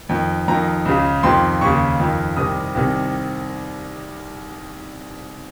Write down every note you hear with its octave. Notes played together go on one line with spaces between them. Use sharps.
F2 D#3
F2 D#3 A#5
C#2 C#3
F2 C3 D#3 C6
D#2 C#3 C#6
F2 D#3
C2 C3 D#3 D#6
C2 C3 D#3